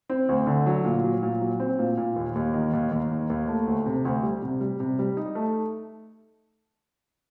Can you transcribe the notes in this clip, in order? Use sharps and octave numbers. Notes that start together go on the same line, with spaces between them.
C4
D2
D3
F#3
A#2
F#3
A#2
F#3
C4
A#2
A#2
D#2
D#2
D#3
D#2
D#2
D#3
D#2
A3
D2
C3
D2
G3
C3
G3
C3
G3
D#4
A3